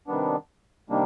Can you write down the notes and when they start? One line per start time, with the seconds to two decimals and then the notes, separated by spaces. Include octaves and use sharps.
0.07 C3 D#3 G3 B3 D4
0.90 C3 D#3 G3 A#3 D4